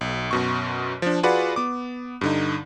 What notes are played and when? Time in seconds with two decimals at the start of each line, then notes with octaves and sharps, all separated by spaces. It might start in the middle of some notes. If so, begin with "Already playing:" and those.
0.01 B1
0.31 F#2 B2 C#6
1.02 F3 D4
1.23 F4 F#4 G#4 B4 D5 F#5
1.56 B3 D6
2.21 G2 D3 D#4